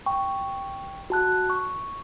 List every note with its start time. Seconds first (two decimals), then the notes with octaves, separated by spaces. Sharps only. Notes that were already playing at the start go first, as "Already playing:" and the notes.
0.06 G5 C#6
1.10 F#4 A5 F#6
1.50 C#6